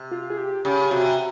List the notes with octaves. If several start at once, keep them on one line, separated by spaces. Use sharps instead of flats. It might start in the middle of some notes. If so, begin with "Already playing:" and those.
Already playing: C3
F4
G#4
G4
C#3 G4
C3 F#4